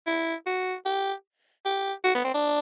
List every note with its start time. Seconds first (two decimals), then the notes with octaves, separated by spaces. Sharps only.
0.07 E4
0.47 F#4
0.85 G4
1.65 G4
2.04 F#4
2.15 B3
2.24 C4
2.34 D4